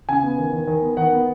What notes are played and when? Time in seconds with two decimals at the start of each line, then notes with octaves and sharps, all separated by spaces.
0.09 C#3 G#5
0.23 B3
0.38 D#3
0.53 D#3
0.67 D#3
0.82 B3
0.97 D#3 F#5
1.12 B3